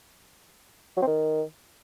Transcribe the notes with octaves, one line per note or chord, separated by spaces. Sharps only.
F#3
C4
D#3